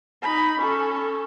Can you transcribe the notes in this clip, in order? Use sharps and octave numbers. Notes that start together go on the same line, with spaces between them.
D#4 B5
C#4 A4